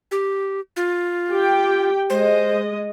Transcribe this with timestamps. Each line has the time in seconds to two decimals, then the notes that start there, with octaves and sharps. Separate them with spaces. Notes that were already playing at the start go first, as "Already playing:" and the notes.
0.11 G4
0.76 F4
1.30 G4 G5
2.10 G#3 C5 D#5